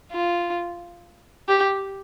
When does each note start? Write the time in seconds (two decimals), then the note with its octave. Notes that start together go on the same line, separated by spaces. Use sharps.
0.12 F4
1.48 G4